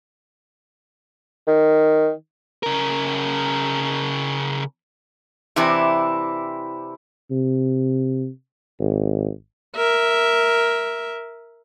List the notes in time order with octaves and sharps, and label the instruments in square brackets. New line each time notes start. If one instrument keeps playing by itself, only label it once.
[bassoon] D#3
[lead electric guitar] C#3 A#4
[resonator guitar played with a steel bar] C3 E3 C4 D4 E4
[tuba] C3
G#1
[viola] A#4 E5